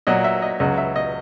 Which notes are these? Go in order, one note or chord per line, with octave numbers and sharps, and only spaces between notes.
A#2 F#3 D#5
E5
D#5
C#2 C#3 F#3 D#5
E5
D#5